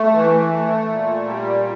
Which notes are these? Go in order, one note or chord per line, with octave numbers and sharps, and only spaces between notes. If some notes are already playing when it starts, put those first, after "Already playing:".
Already playing: A3
E3
A3
A#2
G3